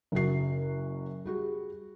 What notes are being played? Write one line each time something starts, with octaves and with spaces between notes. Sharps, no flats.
F#1 F#2 F#4 C7
G3 F#4 G#4